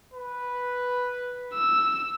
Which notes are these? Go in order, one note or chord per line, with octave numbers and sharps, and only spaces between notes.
B4
E6